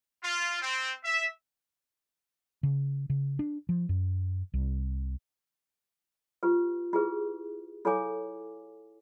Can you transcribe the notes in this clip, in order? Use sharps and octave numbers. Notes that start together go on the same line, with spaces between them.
F4
C4
E5
C#3
C#3
D4
F3
F#2
C2
F4 G4 B4
E4 G4 G#4 B4
E4 A4 C#5 F5 G#5 D6